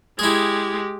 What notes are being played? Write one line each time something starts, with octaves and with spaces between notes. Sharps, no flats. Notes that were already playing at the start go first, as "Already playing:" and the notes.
G#3 E4 G4 G#4